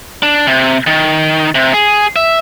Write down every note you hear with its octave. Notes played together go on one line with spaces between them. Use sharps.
D4
C3
D#3
C3
G#4
E5